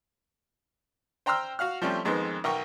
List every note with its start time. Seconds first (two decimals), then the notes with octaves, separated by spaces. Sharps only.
1.26 C5 G5 A#5 C6 E6 F6
1.59 F#4 F5 F#5 F6
1.82 F3 G3 A3 C4 C#4
2.05 F2 D#3 G#3 B3 C4
2.44 B1 A#4 G5 C#6